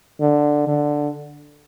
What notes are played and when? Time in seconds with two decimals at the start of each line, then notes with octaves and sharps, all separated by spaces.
0.21 D3
0.67 D3